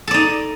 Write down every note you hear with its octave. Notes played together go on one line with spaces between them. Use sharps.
D#4 A4 D5